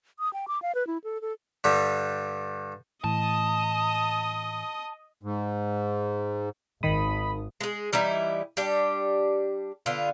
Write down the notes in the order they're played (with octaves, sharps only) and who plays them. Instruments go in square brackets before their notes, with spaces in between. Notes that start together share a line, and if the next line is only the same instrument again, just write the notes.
[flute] D#6
G5
D6
F5
B4
E4
A4
A4
[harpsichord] G2 D3 G3
[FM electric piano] A2 E3 [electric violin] D#5 D#6 [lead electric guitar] A5
[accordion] G#2
[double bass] G#1 [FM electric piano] D#3 D#6 [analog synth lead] B5
[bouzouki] G#3 G#4
E3 G3 D#4 E4
G3 D4 G4
D3 B3 F4